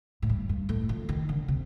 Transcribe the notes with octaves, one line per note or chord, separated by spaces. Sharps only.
A2
G2
G2
A2
F3
D#3
D3
C3